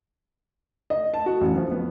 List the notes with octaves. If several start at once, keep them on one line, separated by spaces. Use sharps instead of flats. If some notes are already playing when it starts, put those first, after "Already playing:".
D#5
A5
F#4
A1
F3
B3